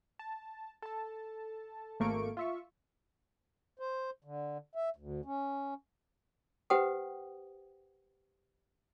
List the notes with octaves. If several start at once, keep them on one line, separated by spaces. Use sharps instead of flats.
A5
A4 A5
G#1 A3 A#3 C#6 D7
F4 E5 C#6
C5
D3
E5
D2
C#4
G4 B4 C5 F#5 G5 D#6